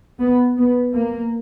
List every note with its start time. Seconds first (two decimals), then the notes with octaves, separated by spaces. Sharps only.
0.20 B3
0.57 B3
0.94 A#3